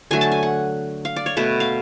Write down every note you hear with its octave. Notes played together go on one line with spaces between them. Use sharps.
D3 F#3 A3 G#5
A5
G#5
F#5
F5
D5
C#5
B2 A3 B4
F5